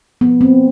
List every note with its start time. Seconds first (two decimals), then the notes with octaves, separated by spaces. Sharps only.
0.21 F3 B3
0.41 A#3 C4